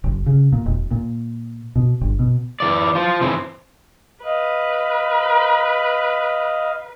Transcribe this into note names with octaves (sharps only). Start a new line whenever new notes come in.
F#1
C#3
A#2
E1
A#2
B2
G1
B2
E3 D5
F4 C5
E3 C4
B4 D#5 F5